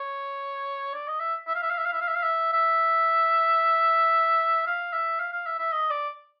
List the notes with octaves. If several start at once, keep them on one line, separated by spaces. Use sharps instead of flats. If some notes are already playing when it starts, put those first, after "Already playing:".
Already playing: C#5
D5
D#5
E5
E5
F5
E5
F5
E5
F5
E5
F5
E5
F5
E5
E5
F5
E5
F5
F5
E5
E5
D#5
D5